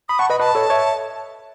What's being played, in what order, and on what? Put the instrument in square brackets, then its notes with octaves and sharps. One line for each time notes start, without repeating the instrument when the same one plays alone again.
[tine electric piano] B5 [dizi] D#6
[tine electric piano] F#5 A5 [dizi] C#6
[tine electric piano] B4 D#5 [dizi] B5
[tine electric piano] B4 D#5 [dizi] A5
[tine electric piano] A4 C#5
C#5 E5